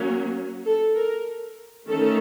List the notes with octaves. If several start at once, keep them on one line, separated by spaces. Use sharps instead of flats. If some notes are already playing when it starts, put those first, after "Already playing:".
Already playing: F#3 A#3 C#4
A4
A#4
D#3 A3 C#4 A4